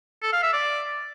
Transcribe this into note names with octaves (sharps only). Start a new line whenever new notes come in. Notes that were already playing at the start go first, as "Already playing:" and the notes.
A4
F5
E5
D5